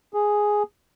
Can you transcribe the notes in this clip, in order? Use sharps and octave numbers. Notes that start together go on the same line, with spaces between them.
G#4